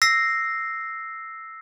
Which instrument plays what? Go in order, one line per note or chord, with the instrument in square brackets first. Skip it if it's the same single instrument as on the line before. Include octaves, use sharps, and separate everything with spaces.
[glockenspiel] E6 A#6 C7